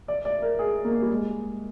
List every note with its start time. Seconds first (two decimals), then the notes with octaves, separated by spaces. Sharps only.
0.08 D5
0.25 D5
0.42 A#4
0.59 G#4
0.85 A#3
1.02 G3
1.10 G#3